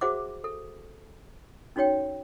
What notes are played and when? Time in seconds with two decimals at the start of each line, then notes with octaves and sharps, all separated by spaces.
0.01 F#4 G#4 C5 E5 F#5 D6
0.44 A4
1.76 C#4 D#4 F#4 C#5 G5